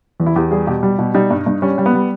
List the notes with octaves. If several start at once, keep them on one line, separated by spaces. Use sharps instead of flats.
E2
E4
E2 G4
G3 G#4
B2 G4
G3
B2
G3 D#4
G2
G2
G3 C#4
G3
B3
G3